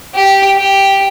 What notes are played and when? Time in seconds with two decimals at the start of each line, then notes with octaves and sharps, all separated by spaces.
0.14 G4
0.57 G4